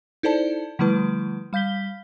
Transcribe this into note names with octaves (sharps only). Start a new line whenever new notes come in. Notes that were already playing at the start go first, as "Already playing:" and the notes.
D#4 E4 A4 C5 D5 A5
D3 F3 G3 A3 E4 B4
G3 F5 G6 B6 G7